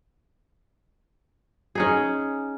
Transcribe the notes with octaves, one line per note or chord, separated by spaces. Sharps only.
C#4 D#4 G#4